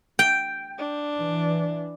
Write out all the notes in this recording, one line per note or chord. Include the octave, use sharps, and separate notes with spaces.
G5
D4
E3